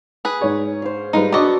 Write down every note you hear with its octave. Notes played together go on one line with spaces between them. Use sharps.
G#4 B4
G#2 C#5
C5 F5
G#2 G3 D#4 F4 B4
B3 D4 F#4 A4 D#5 D6